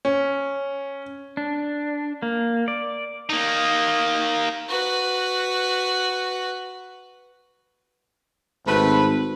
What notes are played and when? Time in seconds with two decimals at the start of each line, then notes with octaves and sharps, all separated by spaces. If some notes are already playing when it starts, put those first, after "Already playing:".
0.05 C#4
1.37 D4
2.22 A#3
2.68 D5
3.29 A#3 D#4
4.69 F#4 B4
8.66 G#1 A3 C4 B4